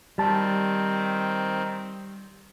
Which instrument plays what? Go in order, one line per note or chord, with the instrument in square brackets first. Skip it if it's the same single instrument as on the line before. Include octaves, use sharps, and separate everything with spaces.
[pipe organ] D#3 C4 [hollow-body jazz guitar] G3 A5